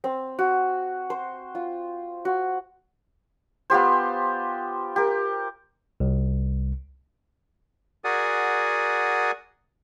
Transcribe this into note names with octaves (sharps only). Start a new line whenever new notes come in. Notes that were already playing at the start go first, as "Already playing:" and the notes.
C4
F#4
C5
F4
F#4
B3 F4 G4 C5
G4 A#4
C2
F#4 G#4 A#4 D5 F#5 G#5